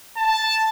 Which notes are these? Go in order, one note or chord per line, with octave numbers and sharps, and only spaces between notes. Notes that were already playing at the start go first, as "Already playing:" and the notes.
A5